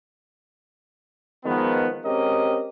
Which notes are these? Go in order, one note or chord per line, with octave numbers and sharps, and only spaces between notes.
D#3 F3 G#3 B3
G#3 C4 C#4 G4 A#4 D#5